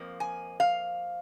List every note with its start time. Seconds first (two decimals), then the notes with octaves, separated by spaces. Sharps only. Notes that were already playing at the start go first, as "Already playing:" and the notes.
Already playing: F2 F3 A#3
0.20 G#5
0.60 F5